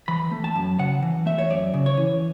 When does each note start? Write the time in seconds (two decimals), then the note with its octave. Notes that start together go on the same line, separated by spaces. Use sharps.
0.08 E3 B5
0.31 A3
0.44 A5
0.55 F#2
0.79 C#3 F#5
1.02 E3
1.26 A3 E5
1.38 C#5
1.50 F#2 D5
1.74 C#3
1.86 C#5
1.97 E3